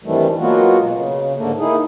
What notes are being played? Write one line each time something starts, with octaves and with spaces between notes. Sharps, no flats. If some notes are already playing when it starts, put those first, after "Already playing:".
G2 C3 D#3 E3 G3 A3
F#3 G#3 A#3 B3 F4 F#4
B2
C#3
G#2 D3 A3 A#3
A#3 D#4 E4 G#4